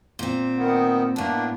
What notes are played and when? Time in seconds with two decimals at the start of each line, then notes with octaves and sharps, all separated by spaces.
0.19 A#2 C4
0.57 D#3 B3
1.16 A2 A#3 B3 D4